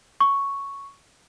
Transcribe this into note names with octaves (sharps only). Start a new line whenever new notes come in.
C#6